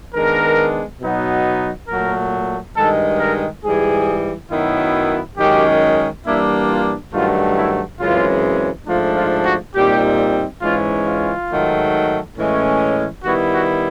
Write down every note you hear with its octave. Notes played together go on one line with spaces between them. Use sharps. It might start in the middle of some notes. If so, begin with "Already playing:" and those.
D#3 G#3 B3 D4 A#4
B2 F#3 B3 D#4
A#2 F#3 A3 A#4
G2 D#3 G#3 A4
A#4
G#2 E3 G3 G#4
F#2 D#3 F#3 B3 E4
F#2 D#3 G#3 C#4 G4
E3 G3 A#3 D4 E4
F4
G2 D#3 F#3 A3 F4
E4
F#2 C#3 E3 G#3 C4 F4
G#2 F3 A3 D4 F4
F4
F#4
A#2 G3 C4 D#4 G4
G#2 E3 G#3 C#4 F4
F4
G#2 D#3 F#3 A3
A2 E3 G#3 C#4
D#3 G3 B3 E4 F#4
F#4